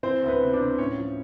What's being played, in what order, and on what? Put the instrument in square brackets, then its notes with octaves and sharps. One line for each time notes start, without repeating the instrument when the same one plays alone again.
[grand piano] E3 C4 C5
D2
B3 B4
C3
D4 D5
C3
A2 C#4 C#5
F3